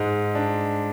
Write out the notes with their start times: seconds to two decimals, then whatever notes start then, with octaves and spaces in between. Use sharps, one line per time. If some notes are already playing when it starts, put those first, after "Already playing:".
Already playing: G#2 G#3
0.35 D4